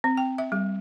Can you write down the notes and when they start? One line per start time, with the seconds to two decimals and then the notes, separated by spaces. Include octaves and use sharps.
0.04 C4
0.17 G5
0.38 E5
0.52 G3